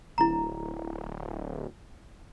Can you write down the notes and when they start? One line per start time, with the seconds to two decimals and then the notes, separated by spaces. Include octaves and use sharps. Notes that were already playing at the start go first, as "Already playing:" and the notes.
0.18 D1 E4 A#5